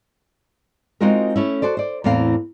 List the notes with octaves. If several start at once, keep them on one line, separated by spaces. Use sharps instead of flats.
G#3 C4 D#4 F4 F#4 A#4
A3 C#4 E4
F#4 A4 C5 D5
C5 D5
E2 A2 A#3 C4 F5